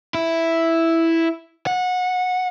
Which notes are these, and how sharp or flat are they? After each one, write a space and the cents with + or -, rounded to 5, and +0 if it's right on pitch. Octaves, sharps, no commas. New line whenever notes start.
E4 +0
F#5 -20